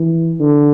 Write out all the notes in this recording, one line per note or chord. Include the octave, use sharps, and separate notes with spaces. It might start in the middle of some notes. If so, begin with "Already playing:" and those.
Already playing: E3
D3